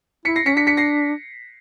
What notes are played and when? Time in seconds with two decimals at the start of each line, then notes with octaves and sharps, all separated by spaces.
0.25 E4 B6 C#7
0.36 A#6 C7
0.46 C#4 B6 C#7
0.57 D4 B6 C#7
0.67 B6 C#7
0.77 A#6 C7